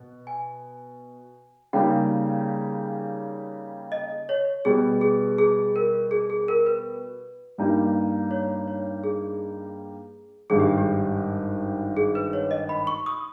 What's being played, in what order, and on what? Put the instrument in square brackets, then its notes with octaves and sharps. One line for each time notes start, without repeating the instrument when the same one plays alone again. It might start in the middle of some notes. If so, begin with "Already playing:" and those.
Already playing: [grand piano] B2
[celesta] G#5
[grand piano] C#3 G3 A#3 D#4 G4 [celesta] G5
[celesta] D#5
C#5
[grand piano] B2 G3 B3 [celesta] G#4
[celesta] G#4
G#4
A#4
G#4
G#4
A#4
B4
[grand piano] G2 G3 A#3 D#4
[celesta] C#5
C#5
G#4
[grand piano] G#1 G2 G3 [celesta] G#4
[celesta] G4
G4
G#4
B4
C#5
D#5
B5
C#6
D#6